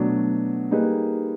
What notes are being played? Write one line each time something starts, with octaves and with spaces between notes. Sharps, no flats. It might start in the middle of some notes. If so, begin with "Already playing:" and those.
Already playing: B2 F#3 A3 D4
G3 A#3 D#4 G#4 B4